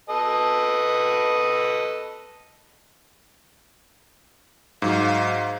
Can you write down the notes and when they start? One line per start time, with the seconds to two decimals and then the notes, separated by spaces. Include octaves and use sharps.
0.09 A4 B4 D#5
4.82 G#2 F#3 F5